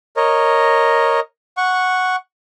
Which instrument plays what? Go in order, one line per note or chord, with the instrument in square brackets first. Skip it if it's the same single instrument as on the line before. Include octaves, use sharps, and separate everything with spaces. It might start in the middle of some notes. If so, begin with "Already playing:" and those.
[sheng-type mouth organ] A#4 C#5 D#5
F#5 C#6